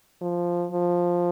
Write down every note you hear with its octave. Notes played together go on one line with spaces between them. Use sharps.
F3
F3